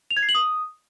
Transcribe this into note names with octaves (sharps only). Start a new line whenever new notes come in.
F7
G#6
C7
F#7
D#6